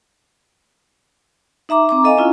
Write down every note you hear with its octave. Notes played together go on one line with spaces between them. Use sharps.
D#4 E5 A#5 D6
C4 A#5 D6
A4 D#5 F5 G#5
C#4 E4 F4